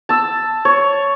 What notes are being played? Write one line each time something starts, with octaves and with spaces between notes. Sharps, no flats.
A5 E6
C#5